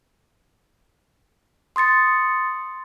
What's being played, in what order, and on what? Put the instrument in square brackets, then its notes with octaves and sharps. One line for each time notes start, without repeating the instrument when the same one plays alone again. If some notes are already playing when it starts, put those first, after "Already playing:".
[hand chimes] C6 D#6 A6 C#7